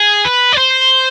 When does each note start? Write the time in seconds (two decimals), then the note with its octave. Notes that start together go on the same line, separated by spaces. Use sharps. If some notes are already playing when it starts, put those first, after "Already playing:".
Already playing: G#4
0.25 B4
0.53 D5
0.58 C5